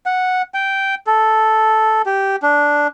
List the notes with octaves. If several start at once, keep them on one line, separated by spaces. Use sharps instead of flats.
F#5
G5
A4
G4
D4